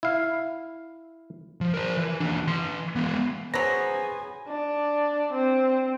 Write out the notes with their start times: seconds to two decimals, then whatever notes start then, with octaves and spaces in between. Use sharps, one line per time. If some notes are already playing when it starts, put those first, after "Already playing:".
0.03 E4 F5
1.61 F3
1.74 A#4 C5
1.97 E3
2.20 D#2 D4
2.47 E3 C6
2.96 G#3 B3
3.54 F#3 B3 G#4 C5 G#5 A#6
4.47 D4
5.32 C4